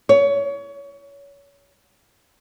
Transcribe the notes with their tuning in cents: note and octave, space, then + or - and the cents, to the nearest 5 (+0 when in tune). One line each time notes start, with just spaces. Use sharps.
C#5 +25